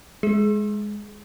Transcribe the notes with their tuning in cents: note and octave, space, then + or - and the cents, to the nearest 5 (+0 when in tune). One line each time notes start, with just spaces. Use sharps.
G#3 +0 G#4 +30